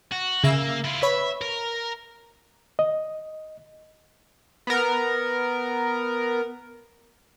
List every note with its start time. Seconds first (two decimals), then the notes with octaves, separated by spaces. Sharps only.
0.12 F#4
0.44 C#3 A#3 E5 E6
0.84 E4 F4
1.02 B4 C#5 E5 B5
1.42 A#4
2.79 D#5
4.67 B3 A#4